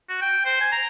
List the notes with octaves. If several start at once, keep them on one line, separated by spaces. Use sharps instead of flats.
F#4
G5
C5
G#5
A#5